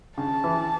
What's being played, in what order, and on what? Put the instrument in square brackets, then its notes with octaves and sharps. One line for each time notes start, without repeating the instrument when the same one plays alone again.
[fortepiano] C#3 [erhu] A5
[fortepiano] E3